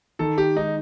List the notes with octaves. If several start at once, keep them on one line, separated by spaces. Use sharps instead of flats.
D#3 A4
G4
G#3 D#4